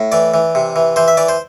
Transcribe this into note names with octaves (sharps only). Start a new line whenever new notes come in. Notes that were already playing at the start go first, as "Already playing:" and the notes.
Already playing: A2
E3 D5
E3
C3
E3
E3 C5
E5
E3 D5
C5